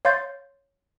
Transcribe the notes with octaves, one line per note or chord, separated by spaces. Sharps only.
C#5 F5 C6 G6 A6